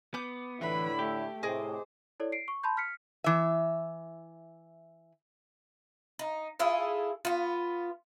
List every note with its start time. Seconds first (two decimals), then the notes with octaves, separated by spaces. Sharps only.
0.14 B3 D6 G6
0.61 A2 D3 E3 E4 B4 B5
0.99 A3 G4
1.43 A2 C3 G#4 C5 D#5 D6
2.20 E4 A4 C#5 D5
2.32 C7 D7
2.48 C#6
2.63 A5 B5 C6 G6
2.77 F6 B6 C#7
3.24 E3 E5
6.19 D#4
6.59 E4 F4 G#4 A4
7.25 B3 F4